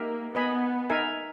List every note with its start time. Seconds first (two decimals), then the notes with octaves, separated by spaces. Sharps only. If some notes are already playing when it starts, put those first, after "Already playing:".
Already playing: A#3 D#4 G4 A#4 E5
0.35 B3 B4 D#5 G#5 B5
0.90 D#4 A#4 E5 G#5